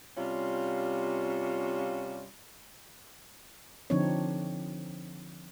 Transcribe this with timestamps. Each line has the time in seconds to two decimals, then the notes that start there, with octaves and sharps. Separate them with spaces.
0.16 C3 G3 C#4 F4
3.90 D3 F3 C4 D4 D#4 C#5